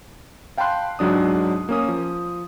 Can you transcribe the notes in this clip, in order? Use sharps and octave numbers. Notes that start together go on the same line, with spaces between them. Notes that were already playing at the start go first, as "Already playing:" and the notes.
F5 G5 A5 B5 C6 F#6
C#2 G#2 F#3 D4 D#6
A#3 C#4 D#6
F3